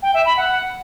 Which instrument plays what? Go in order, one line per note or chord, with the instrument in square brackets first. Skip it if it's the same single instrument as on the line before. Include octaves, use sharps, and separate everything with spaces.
[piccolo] G5
E5
B5
F#5